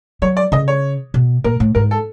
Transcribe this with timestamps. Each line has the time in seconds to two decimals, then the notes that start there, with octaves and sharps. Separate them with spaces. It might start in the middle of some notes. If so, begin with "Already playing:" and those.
0.22 F#3 C#5
0.37 D5
0.52 C#3 D#5
0.68 C#5
1.14 B2
1.44 A#2 A#4
1.60 A2
1.75 G#2 A#4
1.91 A4